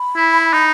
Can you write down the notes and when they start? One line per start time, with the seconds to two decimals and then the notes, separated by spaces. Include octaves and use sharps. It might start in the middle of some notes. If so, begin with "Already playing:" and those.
Already playing: B5
0.16 E4
0.53 D#4